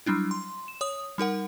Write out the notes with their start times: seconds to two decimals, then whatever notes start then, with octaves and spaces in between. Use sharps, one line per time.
0.06 F#3 G3 D4 E4
0.31 C6
0.68 E7
0.81 C#5 D#6
1.18 G3 D#4 A#4 F#5